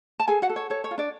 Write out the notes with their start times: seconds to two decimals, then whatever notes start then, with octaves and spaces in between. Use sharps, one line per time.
0.20 A5
0.28 G#4 A4 G#5
0.42 F#4 F#5
0.49 A4
0.56 C#5
0.70 A4 C#5
0.84 C#5
0.91 F4
0.98 D4 D5